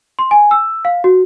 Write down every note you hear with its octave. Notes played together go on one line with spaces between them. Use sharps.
C6
G#5
E6
F5
F#4